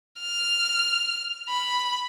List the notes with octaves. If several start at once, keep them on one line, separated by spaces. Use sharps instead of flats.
F6
B5